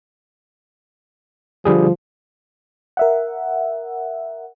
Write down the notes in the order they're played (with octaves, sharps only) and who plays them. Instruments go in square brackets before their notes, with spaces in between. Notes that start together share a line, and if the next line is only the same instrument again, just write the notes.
[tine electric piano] D3 G3 G#4 [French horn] F3
[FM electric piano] A#4 E5 F#5